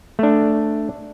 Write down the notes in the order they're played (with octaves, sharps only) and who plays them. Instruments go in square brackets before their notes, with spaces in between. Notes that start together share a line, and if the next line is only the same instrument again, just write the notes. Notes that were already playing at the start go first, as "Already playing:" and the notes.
[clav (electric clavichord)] A3 D4